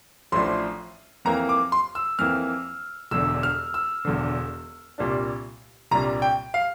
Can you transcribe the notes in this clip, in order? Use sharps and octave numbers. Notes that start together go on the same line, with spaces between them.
A1 A2 F3 A3 D4 C6
F2 E3 A#3 A#5
D6
C6
E6
F2 E3 A#3 F6
E1 E2 D3 E6
F6
E6
E1 E2 D3
C2 A#2 G3 D4
C2 A#2 G3 D4 A#5
G5
F5